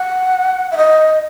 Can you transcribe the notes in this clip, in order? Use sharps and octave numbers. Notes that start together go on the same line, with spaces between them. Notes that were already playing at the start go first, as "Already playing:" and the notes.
Already playing: F#5
E5
D#5